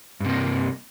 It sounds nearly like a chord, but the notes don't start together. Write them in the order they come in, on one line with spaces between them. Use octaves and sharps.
G2 C3 A#3